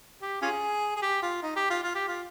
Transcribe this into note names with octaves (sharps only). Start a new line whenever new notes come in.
G4
C#4 F4 G#4
G#4
G4
F4
D#4
G4
F4
F4
G4
F4